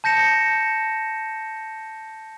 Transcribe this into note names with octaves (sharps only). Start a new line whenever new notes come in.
A5 G6 A#6 C#7 E7